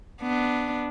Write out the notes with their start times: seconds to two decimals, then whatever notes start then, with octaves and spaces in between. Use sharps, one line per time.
0.22 B3 D4